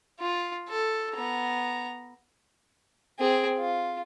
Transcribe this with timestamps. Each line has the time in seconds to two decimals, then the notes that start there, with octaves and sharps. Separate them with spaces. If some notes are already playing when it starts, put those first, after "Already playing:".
0.19 F4
0.68 A4
1.15 B3 A#5
3.20 C4 G#4
3.59 F4